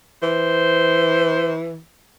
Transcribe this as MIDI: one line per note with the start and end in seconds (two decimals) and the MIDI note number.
0.22 1.80 52
0.22 1.51 72